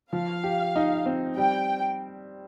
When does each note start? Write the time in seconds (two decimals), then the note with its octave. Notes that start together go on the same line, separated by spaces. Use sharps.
0.12 F3 F5
0.44 G4
0.76 D#4
1.06 C4
1.37 G3 G5